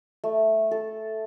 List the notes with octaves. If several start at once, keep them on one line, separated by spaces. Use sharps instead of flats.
A3
A4